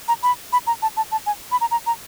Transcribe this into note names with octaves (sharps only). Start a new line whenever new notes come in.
A#5
B5
B5
A#5
A5
A5
A5
G#5
B5
A#5
A#5
A#5